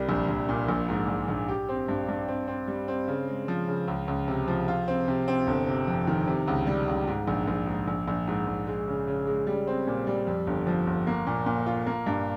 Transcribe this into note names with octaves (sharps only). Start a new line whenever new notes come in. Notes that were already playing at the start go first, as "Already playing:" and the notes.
Already playing: C2 G3
A#1
A#1
A#2
A#1
G#2
A#1
A#1
G4
C4
G2
G2
C4
C4
G3
C4
C#3
G#3
F3
C#3
C#2
C#2
C3
F3
F4
C4
C3
C4
G1
C3
F2
D#3
C3
C#2
G3
C#2
G#2
A#1
A#1
G#2
A#1
A#1
G#2
A#1
G#3
C#3
C#3
G#3
G3
C4
A#2
G3
F2
G1
F3
G1
A#3
A#2
A#2
F4
A#3
G2